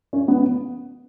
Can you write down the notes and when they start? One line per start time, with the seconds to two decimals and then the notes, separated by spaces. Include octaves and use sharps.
0.13 C#4
0.28 B3